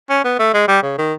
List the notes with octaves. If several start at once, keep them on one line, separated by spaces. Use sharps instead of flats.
C#4
B3
A3
G#3
G3
C#3
D#3